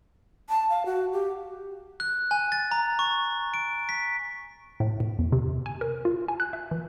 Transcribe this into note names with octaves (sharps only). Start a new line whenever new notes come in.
A5
F5
F#4
G4
F#6
G#5
A6
A#5
C#6
D7
B6
A2
A2
E2
C3
G#5
A#4
F4
G#5
F#6
E5
E3